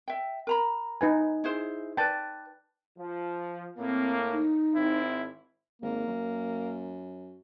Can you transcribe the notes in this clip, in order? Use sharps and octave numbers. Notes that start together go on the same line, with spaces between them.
E5 G5
A#4 A#5 B5
D#4 B4 G#5
E4 G#4 C5
B4 D5 G5 A5
F3
A2 A#3 C4
D#4
G#1 C4 E4
G#1 A#3
F#2